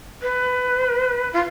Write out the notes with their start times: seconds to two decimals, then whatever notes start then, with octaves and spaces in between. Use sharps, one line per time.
0.21 B4
1.33 F4